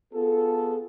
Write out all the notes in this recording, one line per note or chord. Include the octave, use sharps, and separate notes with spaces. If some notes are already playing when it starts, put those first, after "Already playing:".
B3 F4 G#4 A4